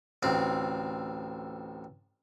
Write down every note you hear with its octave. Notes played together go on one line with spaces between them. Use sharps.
A1 D2 C4